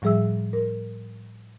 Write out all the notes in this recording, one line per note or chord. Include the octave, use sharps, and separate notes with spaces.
A2 F3 G3 G#4 E5 E6
A#4